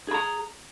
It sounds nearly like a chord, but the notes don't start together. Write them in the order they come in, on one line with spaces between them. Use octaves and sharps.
G#4 B5 A#5